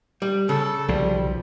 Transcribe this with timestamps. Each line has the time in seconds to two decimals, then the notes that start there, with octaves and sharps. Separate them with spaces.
0.22 G3
0.49 C#3 A4
0.88 B1 F3 G3